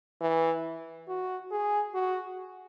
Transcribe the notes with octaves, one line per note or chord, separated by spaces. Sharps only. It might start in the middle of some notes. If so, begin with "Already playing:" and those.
E3
F#4
G#4
F#4